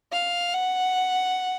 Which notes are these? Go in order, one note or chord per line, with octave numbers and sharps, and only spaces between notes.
F5
F#5